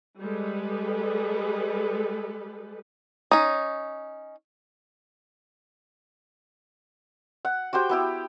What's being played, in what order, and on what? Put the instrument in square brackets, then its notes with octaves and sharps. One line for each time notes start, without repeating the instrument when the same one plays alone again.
[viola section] G3 G#3 A4 B4
[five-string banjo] C#4 D#4
[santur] F#5
F#4 G4 C5 G5
B3 E4 G4